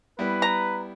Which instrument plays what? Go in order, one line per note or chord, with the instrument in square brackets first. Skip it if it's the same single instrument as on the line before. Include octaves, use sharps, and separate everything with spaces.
[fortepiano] G3 B3 E4 [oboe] B4
[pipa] A#5